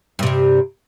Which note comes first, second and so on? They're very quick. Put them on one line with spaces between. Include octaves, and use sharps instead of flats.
G2 C3 G3